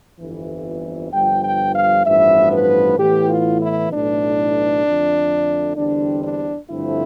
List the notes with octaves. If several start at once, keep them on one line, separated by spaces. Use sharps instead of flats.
G1 F2 E3
G1 G2 F3 G5
G5
F5
A1 G2 F3 B3 E5
B4
A2 E3 B3 G4
F4
E4
B1 A2 E3 D4
F2 D3 A3
E2 D3 G3 C4 D4
D4
G2 D3 F3 A3 C4 E4